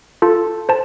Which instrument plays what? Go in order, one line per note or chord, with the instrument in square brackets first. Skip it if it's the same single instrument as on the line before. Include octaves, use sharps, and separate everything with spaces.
[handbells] F4 [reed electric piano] A4
[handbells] C5 A5